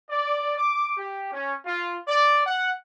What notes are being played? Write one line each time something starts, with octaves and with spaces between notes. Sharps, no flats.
D5
D6
G4
C#4
F4
D5
F#5